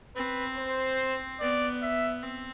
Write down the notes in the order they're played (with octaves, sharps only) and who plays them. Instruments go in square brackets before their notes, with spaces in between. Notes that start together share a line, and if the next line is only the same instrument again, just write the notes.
[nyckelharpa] C4 [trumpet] B4
[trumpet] C5
[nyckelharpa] B3 [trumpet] D5
[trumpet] E5
[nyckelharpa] C4